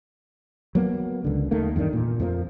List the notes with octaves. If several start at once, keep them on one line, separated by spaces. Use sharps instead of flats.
F#3 A#3 B3
C#2 D3
D#2 D#3 A3 A#3
E2 G2 D#3 D4
A#2
F2 F3 A#3